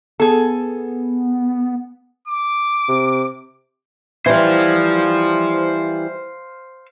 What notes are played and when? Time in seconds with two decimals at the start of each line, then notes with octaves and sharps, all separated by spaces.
0.20 B3 G#4 A4
2.27 D6
2.88 C3
4.26 E3 G3 C5 F5